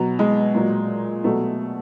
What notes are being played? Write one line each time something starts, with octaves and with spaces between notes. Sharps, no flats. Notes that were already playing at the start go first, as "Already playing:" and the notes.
Already playing: B2 F#3
G#3
A#2 F#3
B2 F#3 A3